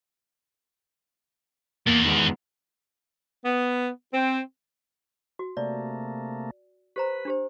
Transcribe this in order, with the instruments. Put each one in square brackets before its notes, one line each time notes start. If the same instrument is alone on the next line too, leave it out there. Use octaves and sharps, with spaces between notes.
[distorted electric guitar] E2 [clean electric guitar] A#3
[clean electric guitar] D#3 G#3 B3
[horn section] B3
C4
[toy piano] F#4
[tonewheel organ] C3 A3 A#3 [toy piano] D5
[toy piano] G4 C5 A#5 [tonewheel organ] B4
[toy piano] D4 G4 C5